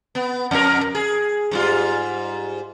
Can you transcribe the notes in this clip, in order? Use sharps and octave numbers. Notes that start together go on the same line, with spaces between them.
B3
F2 A#4
G#4
G#2 G3 F4